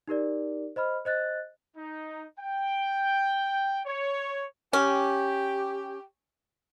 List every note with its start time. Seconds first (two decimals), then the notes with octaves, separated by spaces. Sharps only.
0.08 D#4 G4 A#4 D5
0.76 C5 D#5 B5 F6
1.05 C5 D#5 F#6 A6
1.76 D#4
2.39 G5
3.86 C#5
4.73 C#4 G4